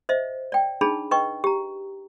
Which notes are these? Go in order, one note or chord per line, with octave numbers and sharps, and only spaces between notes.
C5 D#5 E5
D5 G5
D4 D#4 G#4 A5 B5
B4 D#5 G5 C#6
G4 A#5